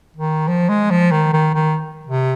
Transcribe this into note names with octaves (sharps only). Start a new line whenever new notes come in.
D#3
F3
G#3
F3
D#3
D#3
D#3
C3